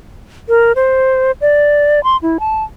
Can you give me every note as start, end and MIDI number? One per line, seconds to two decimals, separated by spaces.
0.49 0.72 70
0.76 1.31 72
1.41 2.03 74
2.04 2.17 84
2.22 2.38 64
2.40 2.64 81